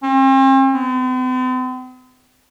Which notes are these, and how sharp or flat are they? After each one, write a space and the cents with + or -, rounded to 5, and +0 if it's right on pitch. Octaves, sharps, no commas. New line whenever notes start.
C4 +45
C4 -45